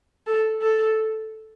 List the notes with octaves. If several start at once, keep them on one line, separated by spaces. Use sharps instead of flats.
A4
A4